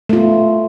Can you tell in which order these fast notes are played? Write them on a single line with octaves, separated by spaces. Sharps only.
A3 F4 B3